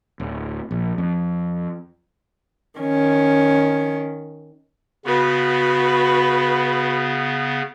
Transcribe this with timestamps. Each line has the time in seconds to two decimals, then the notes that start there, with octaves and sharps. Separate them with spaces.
0.20 D1
0.71 A#1
0.98 F2
2.79 D#3 C#4
5.05 C#3 B3 F#4 B4